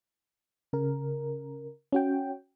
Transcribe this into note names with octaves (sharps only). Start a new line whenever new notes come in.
C#3 A#4
C#4 F#4 G5